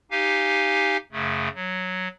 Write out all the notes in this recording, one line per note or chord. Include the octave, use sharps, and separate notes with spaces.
D#4 G4 F5 G#5
F#2 C#3 A3
F#3